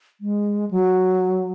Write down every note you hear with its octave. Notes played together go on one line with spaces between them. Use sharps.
G#3
F#3